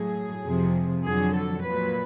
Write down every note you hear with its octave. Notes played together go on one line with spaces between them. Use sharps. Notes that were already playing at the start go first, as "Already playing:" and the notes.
Already playing: A2 F#3 G#4
F2 C3 F3
F2 D3 F#3 G#4
A4
A#2 F#3 B4